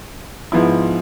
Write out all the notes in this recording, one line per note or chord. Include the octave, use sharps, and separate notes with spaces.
G#2 F3 B3 E4